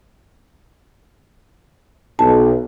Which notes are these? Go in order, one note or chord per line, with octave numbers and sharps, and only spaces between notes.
B1 A5